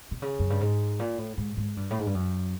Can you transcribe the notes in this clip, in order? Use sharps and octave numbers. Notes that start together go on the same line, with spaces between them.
C3
C#3
F#2
G2
G#2
A#2
A2
G#2
G#2
G2
A2
G#2
G2
F#2